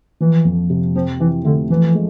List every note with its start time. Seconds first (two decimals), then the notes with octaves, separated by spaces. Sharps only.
0.21 E3 F3
0.45 F2
0.70 C3
0.95 F3 C4
1.20 E3 E4
1.45 D3 A3
1.70 E3 F3
1.95 G#3